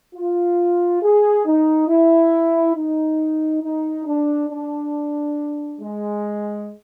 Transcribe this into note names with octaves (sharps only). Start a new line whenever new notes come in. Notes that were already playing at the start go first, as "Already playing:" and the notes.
F4
G#4
D#4
E4
D#4
D#4
D4
D4
G#3